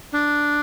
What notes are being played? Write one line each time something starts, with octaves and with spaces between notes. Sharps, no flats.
D4